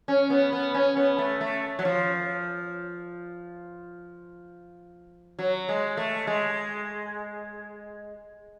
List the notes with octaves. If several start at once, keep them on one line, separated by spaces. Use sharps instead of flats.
C#4
B3
B3
C#4
B3
A3
A3
F#3
F3
F#3
G#3
A3
G#3